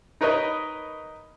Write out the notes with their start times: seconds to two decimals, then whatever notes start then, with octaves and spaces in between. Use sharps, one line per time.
0.21 D#4 A#4 B4 C#5 D#5